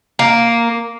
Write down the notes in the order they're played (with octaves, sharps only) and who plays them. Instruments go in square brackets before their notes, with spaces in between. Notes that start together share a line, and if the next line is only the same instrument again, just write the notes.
[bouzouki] A#3